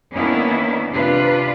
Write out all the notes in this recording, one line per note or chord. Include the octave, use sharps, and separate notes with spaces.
D#3 A#3 B3 C#4 D4 E4
C3 D4 F4 B4